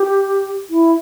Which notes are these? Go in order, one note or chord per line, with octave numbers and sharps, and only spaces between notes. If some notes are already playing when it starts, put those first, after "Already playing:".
Already playing: G4
E4